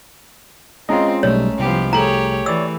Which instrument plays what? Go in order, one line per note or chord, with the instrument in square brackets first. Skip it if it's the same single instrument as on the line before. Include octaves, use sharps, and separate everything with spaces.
[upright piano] G#3 C#4 A#5 [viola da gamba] C4 [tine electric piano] F4 D#5
[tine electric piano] B1 G3 [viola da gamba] A3 [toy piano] C#5
[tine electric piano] C2 [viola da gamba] F3 B3 G4
[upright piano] A3 G#4 F#7 [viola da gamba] G4 C#5 [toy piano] A#5
[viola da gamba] E3 [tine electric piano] C#5 D5 [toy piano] E6